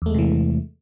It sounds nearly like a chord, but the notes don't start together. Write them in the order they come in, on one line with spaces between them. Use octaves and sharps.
E2 A3 G#3 C3 E3